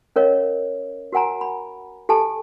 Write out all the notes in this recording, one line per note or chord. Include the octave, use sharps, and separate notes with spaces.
C#4 A#4 C#5 D#5 F5
F#4 A#4 F#5 G#5 A#5
B5
G4 A4 G#5 A5